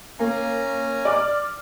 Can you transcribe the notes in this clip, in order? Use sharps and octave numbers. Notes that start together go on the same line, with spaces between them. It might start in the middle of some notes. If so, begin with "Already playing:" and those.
A#3 C#4 G#5 A#5
D5 D6 F6